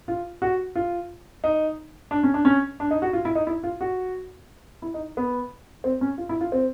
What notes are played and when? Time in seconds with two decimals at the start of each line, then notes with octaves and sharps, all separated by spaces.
0.08 F4
0.42 F#4
0.75 F4
1.44 D#4
2.11 D4
2.23 C#4
2.34 D4
2.45 C#4
2.80 D4
2.91 D#4
3.02 F#4
3.13 F4
3.25 E4
3.35 D#4
3.47 E4
3.63 F4
3.81 F#4
4.82 E4
4.94 D#4
5.17 B3
5.84 C4
6.01 C#4
6.18 F4
6.29 E4
6.41 F4
6.52 C4